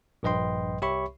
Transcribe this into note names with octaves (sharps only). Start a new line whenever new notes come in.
A#1 G2 B4 D#5 G5 C6
C2 G4 C#5 E5 B5 C#6